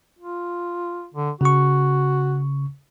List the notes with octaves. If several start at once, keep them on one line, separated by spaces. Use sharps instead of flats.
F4
D3
C#3 F#4 C#6